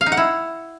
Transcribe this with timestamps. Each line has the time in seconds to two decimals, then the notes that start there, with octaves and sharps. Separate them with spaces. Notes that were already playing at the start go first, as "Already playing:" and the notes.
0.01 F5
0.06 D#4
0.12 F#5
0.17 E4